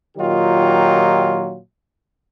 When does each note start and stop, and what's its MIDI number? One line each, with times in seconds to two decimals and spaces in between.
0.17 1.58 46
0.17 1.58 51
0.17 1.58 54
0.17 1.58 63
0.17 1.58 65
0.17 1.58 67